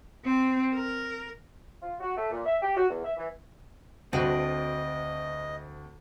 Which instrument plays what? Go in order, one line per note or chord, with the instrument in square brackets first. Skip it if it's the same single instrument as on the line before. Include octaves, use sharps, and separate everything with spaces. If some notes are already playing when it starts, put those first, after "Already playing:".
[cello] C4
A#4
[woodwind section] F4
F#4
A3
A#2
E5
G4
F#4
E2
E5
E3
[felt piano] D2 [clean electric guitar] C4 D4 B4 [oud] F#4 [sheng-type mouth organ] D#5